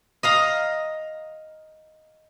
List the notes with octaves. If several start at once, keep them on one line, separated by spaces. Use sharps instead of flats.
D#5 F5 A#5